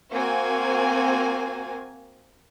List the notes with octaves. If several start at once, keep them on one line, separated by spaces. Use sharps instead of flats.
A#3 C4 F#4 G#5